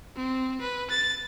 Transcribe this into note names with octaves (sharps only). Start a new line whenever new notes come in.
C4
B4
A6